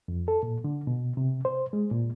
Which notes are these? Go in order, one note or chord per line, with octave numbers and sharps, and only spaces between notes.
F2
A4
A#2
D3
B2
C3
C5
G#3
A#2